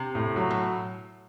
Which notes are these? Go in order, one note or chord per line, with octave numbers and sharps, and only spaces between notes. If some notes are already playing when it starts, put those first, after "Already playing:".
Already playing: C3
A2
F#3
B2